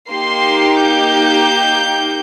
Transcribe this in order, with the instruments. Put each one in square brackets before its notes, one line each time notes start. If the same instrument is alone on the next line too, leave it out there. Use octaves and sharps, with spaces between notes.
[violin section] A#3 D#4 G4 C6
G6